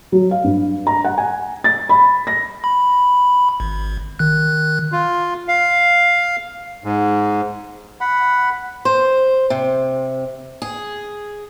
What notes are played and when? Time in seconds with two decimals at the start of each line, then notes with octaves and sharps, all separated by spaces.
0.12 F#3
0.31 F5
0.44 G2
0.87 A#5
1.04 F#5
1.18 G#5
1.64 A6
1.89 B5
2.27 A#6
2.64 B5
3.60 G#1
4.19 D#3 F#6
4.92 F4
5.48 F5
6.84 G#2
8.01 F#5 B5
8.85 C5
9.50 C3
10.62 G#4